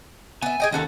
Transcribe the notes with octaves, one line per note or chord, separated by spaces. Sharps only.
B3 E5 G#5
G#4 D#5 G5
D#2 C#4 F#4 A4